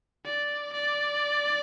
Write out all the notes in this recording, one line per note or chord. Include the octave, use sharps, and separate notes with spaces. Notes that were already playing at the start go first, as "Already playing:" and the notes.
D5
D5